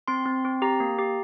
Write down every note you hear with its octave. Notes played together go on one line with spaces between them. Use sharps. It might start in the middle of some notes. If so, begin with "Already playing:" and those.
C4 C6
C4
C4
G4 A#5
A#3
G4